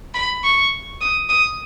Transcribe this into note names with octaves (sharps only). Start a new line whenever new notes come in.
B5
C#6
D#6
D#6